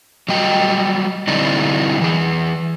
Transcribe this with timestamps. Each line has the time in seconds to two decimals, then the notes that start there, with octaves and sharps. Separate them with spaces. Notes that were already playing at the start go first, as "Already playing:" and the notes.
0.29 F#3 G3 D#5 G5
1.28 D3 G3 C4 D#4 E4 D5
2.01 E3 G#4